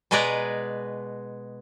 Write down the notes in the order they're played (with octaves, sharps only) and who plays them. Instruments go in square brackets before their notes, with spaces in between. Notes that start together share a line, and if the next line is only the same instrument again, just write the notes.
[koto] B2 G#3 G#4 B4 D5 A#5